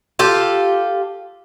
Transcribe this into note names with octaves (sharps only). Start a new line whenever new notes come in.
F4 G4 A4